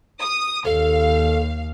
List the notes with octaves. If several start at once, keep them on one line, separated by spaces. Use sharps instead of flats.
D#6
D#2 A4 F5